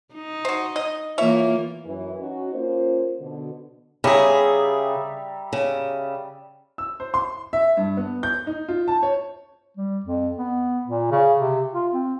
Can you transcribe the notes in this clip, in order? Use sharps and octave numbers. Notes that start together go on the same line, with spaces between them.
D#4
F#4 C5
D#5
E3 A#3 F4 C#5 E5
F#2 E3
C#4 D#4 F#4
A#3 C#4 F4 C5
B2 D3
C#3 G3 G#4 E5 A#5
C#3
E6
C5
C6
E5
G2
B3
G6
D#4
F4
A5
C#5
G3
F2
B3
A#2
C#3
C3
F4
C4